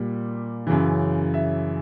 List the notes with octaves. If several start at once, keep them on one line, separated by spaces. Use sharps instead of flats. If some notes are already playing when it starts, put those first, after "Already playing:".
Already playing: A#2 G3
F#2 C#3 E3
E5